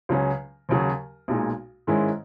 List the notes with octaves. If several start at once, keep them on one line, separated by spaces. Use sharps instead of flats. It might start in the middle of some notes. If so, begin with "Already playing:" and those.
C#2 C#3 F#3 C#4
D#2 C#3 F#3
B1 A#2 G#3 D#4
G#2 D#3 G#3 C#4 E4